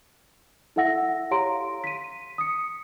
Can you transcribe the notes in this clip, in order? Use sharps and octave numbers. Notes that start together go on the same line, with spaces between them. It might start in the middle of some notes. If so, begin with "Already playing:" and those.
E4 A4 E5 F#5 E6 A#6
G4 C#5 F5 A#5 C6 D7
B6 D#7
D#6 C#7